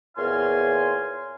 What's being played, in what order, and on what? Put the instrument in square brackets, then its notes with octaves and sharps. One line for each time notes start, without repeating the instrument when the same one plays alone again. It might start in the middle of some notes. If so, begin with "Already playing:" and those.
[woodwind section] E2 A#2 C#5 F5 G#5 C6